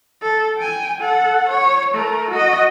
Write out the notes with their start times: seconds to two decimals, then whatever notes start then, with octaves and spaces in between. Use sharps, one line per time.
0.22 A4
0.58 G5 G#5
1.00 A4 F#5
1.49 C#5
1.94 A3 A#4
2.30 F#4 D#5